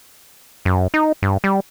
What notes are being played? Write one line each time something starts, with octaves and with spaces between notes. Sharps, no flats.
F#2
D#4
G2
G3